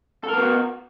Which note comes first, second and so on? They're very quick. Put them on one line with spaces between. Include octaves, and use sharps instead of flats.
A4 A#4 B3 F#4